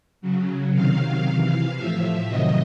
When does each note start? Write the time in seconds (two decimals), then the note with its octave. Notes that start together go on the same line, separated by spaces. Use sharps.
0.21 C#3 F#3
0.72 C3 D#3 F#3 F5
1.24 C3 E3
1.76 A2 F3 E5
2.27 C3 D#3 F#3 D#5